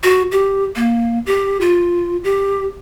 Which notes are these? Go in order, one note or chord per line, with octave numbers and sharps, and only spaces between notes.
F#4
G4
A#3
G4
F4
G4